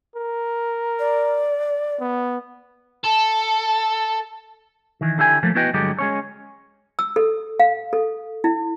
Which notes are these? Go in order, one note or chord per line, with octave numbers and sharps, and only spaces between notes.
A#4
D5
B3
A4
D#3 E3
D3 E4 G4 D#5 G#5
F3 A3 A#3
B3 E4 F#4 B4 D#5 G5
G2 D3 F#3 G#3 G4
G#3 C#4 C#5
E6
A4
F5
A4
E4